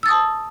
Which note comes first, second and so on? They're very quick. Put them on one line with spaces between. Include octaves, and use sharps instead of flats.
E6 A6 D#6 A5